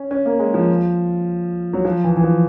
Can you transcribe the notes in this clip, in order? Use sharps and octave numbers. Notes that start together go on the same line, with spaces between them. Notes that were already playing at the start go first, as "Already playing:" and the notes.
Already playing: C#4
C#4
A#3
G#3
F3
F#3
F3
E3
E3
F3